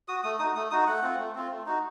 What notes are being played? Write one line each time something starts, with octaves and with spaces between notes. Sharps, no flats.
F#4 D#6
A3 D#6
D#4 F#4 D#6
A3 D#6
D#4 F#4 D#6
A3 F#5
C4 F4
A3
C4 F4
A3
D#4 F#4